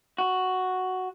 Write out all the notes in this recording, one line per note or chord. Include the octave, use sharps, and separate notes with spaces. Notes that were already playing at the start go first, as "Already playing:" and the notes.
F#4